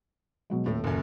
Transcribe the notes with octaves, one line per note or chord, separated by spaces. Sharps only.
B2 F#3 G#3
D#1 A2 A4
F#1 F#2